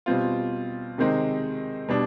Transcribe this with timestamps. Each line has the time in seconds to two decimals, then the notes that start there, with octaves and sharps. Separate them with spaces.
0.06 B2 G3 C4 F4
0.98 C3 D#3 G#3 C4 D#4
1.88 B2 G3 D4